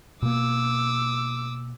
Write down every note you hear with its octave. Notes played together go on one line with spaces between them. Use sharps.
B2 A#3 D6 E6